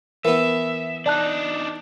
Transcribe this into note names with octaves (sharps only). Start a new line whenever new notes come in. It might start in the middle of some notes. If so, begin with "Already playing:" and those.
E3 B3 A#4 E5
D4 D#4 D5 A5 F#6